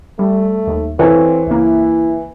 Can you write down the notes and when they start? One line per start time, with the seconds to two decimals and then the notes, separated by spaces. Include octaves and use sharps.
0.19 G3 A3
0.67 D#2
0.99 E3 C4 A4 C#5 F5
1.47 C#2 A#3 E4